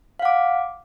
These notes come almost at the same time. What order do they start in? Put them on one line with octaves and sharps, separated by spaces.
F5 F#5 D6